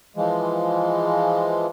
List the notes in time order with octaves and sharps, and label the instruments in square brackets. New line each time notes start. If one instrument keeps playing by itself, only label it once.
[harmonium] E3 F3 G#3